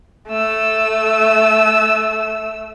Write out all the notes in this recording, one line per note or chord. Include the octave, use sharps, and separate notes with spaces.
A3 E6